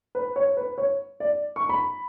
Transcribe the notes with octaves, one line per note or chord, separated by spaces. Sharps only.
B4
C#5
B4
C#5
D5
C#6
B5